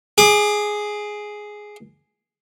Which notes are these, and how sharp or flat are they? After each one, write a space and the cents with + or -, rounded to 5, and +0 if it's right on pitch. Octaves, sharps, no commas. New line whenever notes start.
G#4 +5 D6 +35